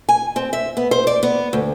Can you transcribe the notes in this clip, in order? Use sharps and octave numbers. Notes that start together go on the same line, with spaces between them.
G#5
C4
E5
B3
C5
D5
B3
D2